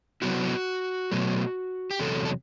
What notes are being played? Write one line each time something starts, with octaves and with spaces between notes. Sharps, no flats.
C3 F#3 B3 E4 F#4
B2 F#3 A3
G4
E2 C3 F#3 A4
A4